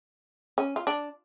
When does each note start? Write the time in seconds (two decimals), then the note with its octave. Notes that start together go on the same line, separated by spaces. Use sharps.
0.58 C#4
0.76 F4
0.87 D4